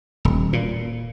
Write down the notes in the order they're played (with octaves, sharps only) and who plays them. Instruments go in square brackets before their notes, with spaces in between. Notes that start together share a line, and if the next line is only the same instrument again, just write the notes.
[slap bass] D#1
A#2